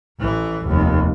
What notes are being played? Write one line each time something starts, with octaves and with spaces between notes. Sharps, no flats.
A1 E3
F1 D#2